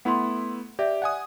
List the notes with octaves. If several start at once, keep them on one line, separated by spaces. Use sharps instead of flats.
A3 B3 E4 F#5 C6
G4 D5 E5
F#5 G#5 D#6